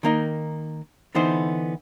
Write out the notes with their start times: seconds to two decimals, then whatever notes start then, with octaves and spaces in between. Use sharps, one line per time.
0.03 D#3 A#3 D#4
1.15 D3 E3 B3 D#4 C5